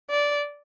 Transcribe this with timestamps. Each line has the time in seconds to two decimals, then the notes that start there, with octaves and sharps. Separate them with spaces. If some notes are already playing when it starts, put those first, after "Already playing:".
0.10 D5